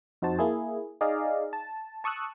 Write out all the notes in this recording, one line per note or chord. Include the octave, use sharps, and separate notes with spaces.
F2 D#4 F#4 C5 A5
A#3 E4 G#4
D#4 G#4 D5 D#5 F5
A5
A5 C#6 D#6 E6 F#6